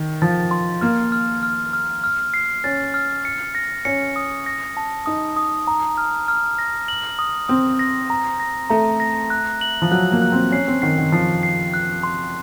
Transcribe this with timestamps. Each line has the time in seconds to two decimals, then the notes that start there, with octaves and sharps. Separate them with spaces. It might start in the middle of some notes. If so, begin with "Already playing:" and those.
Already playing: D#3
0.22 F3 A6
0.51 C6
0.81 A#3 F6
1.12 F6
1.43 F6
1.73 F6
2.04 F6
2.34 C7
2.64 C#4 A6
2.94 F6
3.25 C#7
3.55 A#6
3.85 C#4 C#7
4.16 D#6
4.46 A#6
4.77 A5
5.06 D#4 D#6
5.37 D#6
5.67 A#5
5.98 F6
6.28 F6
6.58 A#6
6.88 F#7
7.19 D#6
7.49 C4 D#6
7.79 A#6
8.10 A#5
8.40 A#6
8.70 A3 A#5
9.00 A#6
9.30 F#6
9.61 F#7
9.82 F3
9.91 F#3 F#6
10.12 A#3
10.22 F#6
10.32 C4
10.52 C#4 C7
10.68 C4
10.82 D#3 C7
10.98 D#3
11.12 F3 C7
11.43 C7
11.74 F#6
12.03 C6